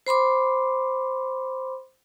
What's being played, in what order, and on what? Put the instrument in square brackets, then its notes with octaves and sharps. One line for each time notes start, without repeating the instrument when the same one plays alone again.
[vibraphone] C5 B5 C6 D6